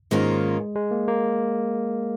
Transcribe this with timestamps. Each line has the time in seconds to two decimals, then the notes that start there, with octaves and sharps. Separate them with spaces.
0.11 G#2 D#3 G#3 A#3 C#4 F4
0.76 G#3
0.91 A#3
1.08 A#3